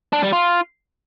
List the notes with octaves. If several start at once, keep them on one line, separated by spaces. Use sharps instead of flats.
D4
G3
F4